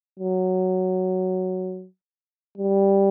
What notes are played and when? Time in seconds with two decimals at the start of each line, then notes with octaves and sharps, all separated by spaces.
0.20 F#3
2.58 G3